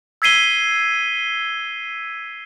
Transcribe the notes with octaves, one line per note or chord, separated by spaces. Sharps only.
E6 G#6 B6 C7 D#7 G7